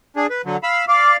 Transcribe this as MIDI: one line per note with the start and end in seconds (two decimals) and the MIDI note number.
0.16 0.27 62
0.16 0.27 68
0.30 0.42 71
0.45 0.57 50
0.45 0.57 54
0.63 0.85 77
0.63 0.85 83
0.63 0.85 88
0.88 1.17 74
0.88 1.17 77
0.88 1.11 86